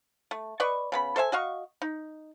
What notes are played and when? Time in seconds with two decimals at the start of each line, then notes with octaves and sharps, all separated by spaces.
0.31 A3
0.60 B4 D5 D#5 C#6
0.92 C#3 B3 B5
1.16 A4 C5 E5 G#5
1.32 F#4 D#5 F5 C#6
1.82 D#4